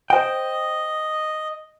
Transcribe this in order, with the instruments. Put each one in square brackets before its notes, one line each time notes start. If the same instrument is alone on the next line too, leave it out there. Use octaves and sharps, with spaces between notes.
[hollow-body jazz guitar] C5 G5 [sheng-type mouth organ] D#5